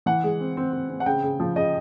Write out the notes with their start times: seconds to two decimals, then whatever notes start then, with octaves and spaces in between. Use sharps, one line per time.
0.06 E3 F#5
0.24 G#3
0.40 C4
0.57 C4
0.73 C4
0.89 C4
1.00 F#5
1.06 C#3 G5
1.23 C#3
1.40 F3
1.56 C#3 D#5